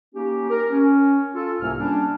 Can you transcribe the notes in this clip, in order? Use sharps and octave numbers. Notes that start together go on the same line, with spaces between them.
A#3 C#4 D#4 G4
A#4
C#4
F4 A4
C2 G#2 C3 A#3 G#5 F6
G3 A#3 C#4 D4